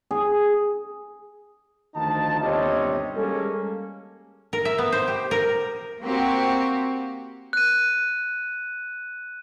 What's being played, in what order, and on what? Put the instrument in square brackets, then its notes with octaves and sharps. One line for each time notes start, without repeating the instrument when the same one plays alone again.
[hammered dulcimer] G#4
[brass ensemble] D2 D#3 F3 D#4 A5
G1 D#2 C3 G3 C#5 D#5
G3 G#3 A#3 C#4 A4
[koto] A#4
E5
B3
C5
G4
A#4
[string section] A#3 C4 F#4 G4
[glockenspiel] F#6 D#7